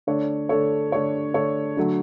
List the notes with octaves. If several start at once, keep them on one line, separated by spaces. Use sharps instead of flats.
D3 A3 D4 A4 C#5
D3 A3 D4 A4 C#5
D3 A3 D4 A4 C#5
D3 A3 D4 A4 C#5
D3 F#3 A3